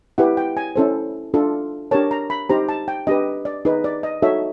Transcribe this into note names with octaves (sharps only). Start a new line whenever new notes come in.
E4 G4 B4 F#5
G5
G#5
C#4 E4 A4 C5
D4 F4 A4
D4 G4 A#4 C#5 A5
A#5
B5
D#4 G4 C5 A#5
A5
G5
D4 G4 B4 D#5
D5
D#4 G#4 B4
D5
D#5
D#4 F#4 A4 C#5 E5